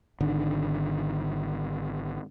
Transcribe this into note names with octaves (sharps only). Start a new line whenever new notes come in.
G#1 D3 D#3